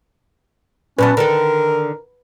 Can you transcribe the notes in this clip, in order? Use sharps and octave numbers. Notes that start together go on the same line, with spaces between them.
A#2 F#3 B3 C#4 B4 A5
D3 D#3 A4 A#4